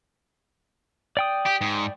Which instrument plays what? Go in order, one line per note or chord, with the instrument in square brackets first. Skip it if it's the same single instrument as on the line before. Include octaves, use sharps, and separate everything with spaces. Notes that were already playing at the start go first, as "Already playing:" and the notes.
[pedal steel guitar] D5 G5 D#6
[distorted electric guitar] G4
G#2